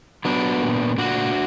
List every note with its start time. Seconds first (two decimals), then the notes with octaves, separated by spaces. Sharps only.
0.25 F#3 B3 D4
0.62 A#2
0.98 A#2 D4 F#4